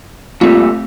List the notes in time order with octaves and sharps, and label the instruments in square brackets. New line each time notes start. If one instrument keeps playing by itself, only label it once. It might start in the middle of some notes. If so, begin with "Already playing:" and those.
[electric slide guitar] A#2 G3 A3 [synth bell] C4 F4